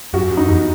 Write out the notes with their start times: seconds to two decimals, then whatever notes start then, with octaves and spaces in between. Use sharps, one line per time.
0.14 F#2 F#4
0.31 F#2
0.37 D#4
0.48 E2